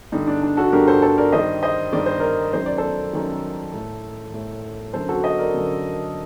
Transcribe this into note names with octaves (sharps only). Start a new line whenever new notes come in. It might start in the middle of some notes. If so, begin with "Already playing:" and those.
G2 D3 D#4
D4
D4
F#4 A4
G2 D3 G4 A#4
A4 C5
A4 C5
A#4 D5
G2 D#3 C5 D#5
C5 D#5
G2 D#3 D5
C5
A#4 D5
F#2 D#3 C5
D5
A4 C5
F#2 D#3
A2
A2
F#2 D3 A4 C5
F#4 A4
C5 D#5
A#4 D5
F#2 D3